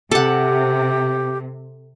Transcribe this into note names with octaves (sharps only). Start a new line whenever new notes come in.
C3 G4 A4 F#5